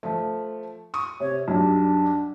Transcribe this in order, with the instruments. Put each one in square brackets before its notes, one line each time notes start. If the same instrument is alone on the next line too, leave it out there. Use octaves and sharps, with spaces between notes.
[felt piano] F3 A3
C#6 D#6
[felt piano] C3 [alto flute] C#5
[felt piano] B1 F#2 G3 [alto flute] D4